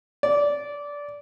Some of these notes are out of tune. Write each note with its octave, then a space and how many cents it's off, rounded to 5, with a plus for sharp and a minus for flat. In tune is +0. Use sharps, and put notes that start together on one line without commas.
D5 -15